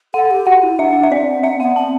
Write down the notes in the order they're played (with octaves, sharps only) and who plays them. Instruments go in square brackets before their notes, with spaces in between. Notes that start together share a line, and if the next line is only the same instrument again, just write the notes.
[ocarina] A4 [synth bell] F#5
[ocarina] G4
[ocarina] F#4 [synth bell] F#5
[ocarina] E4
[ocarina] D4 [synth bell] E5
[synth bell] E5
[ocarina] C4 [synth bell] D5
[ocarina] C4 [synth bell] E5
[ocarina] B3 [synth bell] F#5
[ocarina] C4 [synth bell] A5